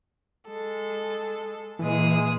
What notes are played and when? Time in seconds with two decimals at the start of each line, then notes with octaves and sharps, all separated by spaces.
0.47 G#3 A4
1.79 A#2 E3 G#3 D#6